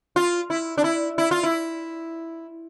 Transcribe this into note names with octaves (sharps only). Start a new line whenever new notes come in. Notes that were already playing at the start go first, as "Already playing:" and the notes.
F4
E4
D4
E4
E4
F4
E4